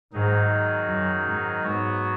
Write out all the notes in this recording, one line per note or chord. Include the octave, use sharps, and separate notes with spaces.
G#2 D#3 F#3 D#4 G#4
F#2
G#2
G#2 F#3 B3 F#4 C#5